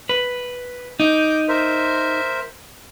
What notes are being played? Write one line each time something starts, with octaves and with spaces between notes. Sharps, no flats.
B4
D#4 D6 G6
A#4 C5 E5